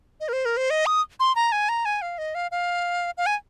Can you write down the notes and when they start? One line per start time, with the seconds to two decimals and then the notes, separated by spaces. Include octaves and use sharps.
0.20 D#5
0.29 A#4
0.33 C5
0.45 A#4
0.57 C5
0.70 D#5
0.86 D#6
1.20 C6
1.36 A#5
1.52 G#5
1.69 A#5
1.85 G#5
2.02 F5
2.18 D#5
2.35 F5
2.51 F5
3.18 F5
3.26 G#5